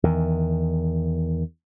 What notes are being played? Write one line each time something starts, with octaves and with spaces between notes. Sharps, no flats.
E2 D#3